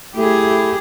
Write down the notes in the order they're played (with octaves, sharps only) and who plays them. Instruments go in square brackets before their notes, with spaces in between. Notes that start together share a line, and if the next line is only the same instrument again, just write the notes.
[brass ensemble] A3 E4 [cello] G4 G#4